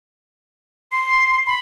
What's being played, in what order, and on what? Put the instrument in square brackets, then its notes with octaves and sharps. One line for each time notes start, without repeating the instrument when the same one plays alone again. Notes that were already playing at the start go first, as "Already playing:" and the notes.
[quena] C6 [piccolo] C7
[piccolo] B5